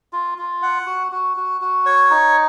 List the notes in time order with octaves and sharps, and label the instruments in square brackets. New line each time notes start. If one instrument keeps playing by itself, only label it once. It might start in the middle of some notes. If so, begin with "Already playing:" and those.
[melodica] F4
F4
F#5
F#4
F#4
F#4
F#4
C#5
D#4